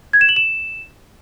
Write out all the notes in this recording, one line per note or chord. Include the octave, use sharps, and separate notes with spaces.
G#6
E7
F#7
E7